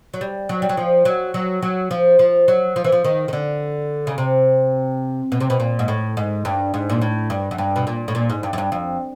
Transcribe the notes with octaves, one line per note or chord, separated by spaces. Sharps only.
F#3
G3
F#3
G3
F#3
F3
F#3
F#3
F#3
F3
F3
F#3
F3
E3
F3
D#3
D#3
D3
C#3
C3
B2
C3
B2
A#2
G#2
A2
G#2
G2
G#2
A#2
A2
G2
F#2
G2
B2
A#2
A2
A#2
G#2
G2
F#2
G2
F2